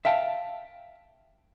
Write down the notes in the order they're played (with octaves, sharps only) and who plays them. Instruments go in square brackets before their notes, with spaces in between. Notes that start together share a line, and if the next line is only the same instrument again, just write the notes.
[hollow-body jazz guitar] E5 F5 G5 A5